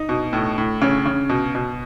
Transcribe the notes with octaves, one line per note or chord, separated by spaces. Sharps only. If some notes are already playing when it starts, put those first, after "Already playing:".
Already playing: D#4
B2
A2
A2
C#3 C#4
C#3
B2
B2